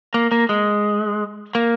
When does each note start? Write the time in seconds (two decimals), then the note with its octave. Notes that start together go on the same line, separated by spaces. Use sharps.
0.14 A#3
0.32 A#3
0.49 G#3
1.55 A#3